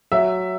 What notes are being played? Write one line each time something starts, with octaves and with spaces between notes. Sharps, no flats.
F#3 E5